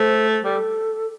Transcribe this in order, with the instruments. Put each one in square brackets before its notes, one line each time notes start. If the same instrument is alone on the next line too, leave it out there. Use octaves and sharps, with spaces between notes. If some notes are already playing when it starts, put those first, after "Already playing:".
Already playing: [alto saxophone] A3 [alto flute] C5
[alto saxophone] G3 [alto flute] A4